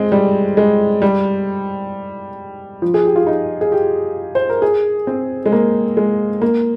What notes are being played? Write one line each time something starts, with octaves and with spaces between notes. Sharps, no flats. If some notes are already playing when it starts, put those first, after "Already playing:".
Already playing: G#3 C4
G3
G#3
G3
F3
G#4
G4
F4
D#4
G#4
G4
C5
A#4
G#4
C4
G#3
A#3
G#3
A#3